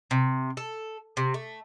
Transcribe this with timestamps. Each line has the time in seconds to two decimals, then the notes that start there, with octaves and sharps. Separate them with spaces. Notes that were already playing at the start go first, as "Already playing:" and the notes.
0.11 C3
0.57 A4
1.17 C3
1.34 A3